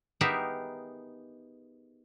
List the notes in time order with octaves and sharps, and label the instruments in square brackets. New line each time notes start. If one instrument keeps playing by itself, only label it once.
[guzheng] B3 D#4 G4 G#4 A#4 E5